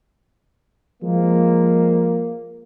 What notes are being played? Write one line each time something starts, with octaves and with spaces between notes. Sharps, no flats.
F3 G#3 A#3